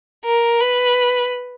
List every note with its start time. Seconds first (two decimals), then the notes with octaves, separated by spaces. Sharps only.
0.25 A#4
0.61 B4